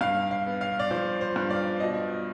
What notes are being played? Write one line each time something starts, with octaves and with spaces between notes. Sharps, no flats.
G2 F5
F5
B3
F5
D5
F3 C5
C5
G2
D5
B2 D#5